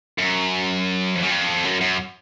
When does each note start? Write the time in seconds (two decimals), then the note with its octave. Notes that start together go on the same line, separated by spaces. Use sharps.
0.18 F#2
1.15 F2
1.23 F#2
1.31 F2
1.64 F#2
1.81 F#2